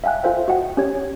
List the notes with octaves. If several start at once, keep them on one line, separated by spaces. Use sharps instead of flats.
E5 F5 G5 G#5 F#6
F4 A4 C5 E5 F5
F#4 D#5 F#5 G5
C#4 G4 C#5 G#6